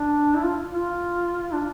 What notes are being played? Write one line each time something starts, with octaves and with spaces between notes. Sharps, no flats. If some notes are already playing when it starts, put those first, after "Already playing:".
Already playing: D4
E4
F4
F4
D4